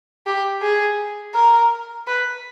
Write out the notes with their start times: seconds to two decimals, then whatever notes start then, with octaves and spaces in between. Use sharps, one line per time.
0.26 G4
0.62 G#4
1.35 A#4
2.07 B4